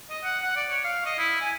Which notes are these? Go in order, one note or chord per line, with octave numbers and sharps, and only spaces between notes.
D#5
F#5
F#5
D5
C#5
F5
D#5
E4
G#5